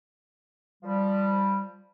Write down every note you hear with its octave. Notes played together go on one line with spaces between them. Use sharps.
F3 G3